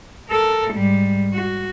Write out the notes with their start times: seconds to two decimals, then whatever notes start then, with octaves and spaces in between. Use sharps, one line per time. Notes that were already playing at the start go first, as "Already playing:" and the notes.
0.30 A4 A#4
0.72 G#2 G3
1.34 F#4